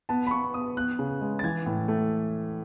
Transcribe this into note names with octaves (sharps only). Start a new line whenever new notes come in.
B3 A5
B5
B3 C#6
B3 D#6
B3 F#6
C#3
G#3
A6
E3 G#6
A2
A3